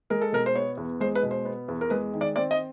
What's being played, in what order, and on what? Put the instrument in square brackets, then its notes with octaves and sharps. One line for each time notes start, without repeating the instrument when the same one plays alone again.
[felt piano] G#3 A#4
A4
B2 A#4
C5
B3 C#5
E2
G#3 C5
B4
B2
C5
B3
E2
A#4
G#3 B4
D#3
D5
C4 D5
D#5